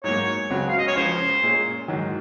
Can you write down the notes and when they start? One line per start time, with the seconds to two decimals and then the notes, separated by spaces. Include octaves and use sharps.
0.04 G#2 F#3 A#3 C#5
0.50 C#2 C#3 F#3 C4 F#4
0.69 F5
0.79 D#5
0.87 C#5
0.96 C#2 C#3 F3 C5
1.43 A#2 G#3 C#4
1.88 G#2 D#3 F#3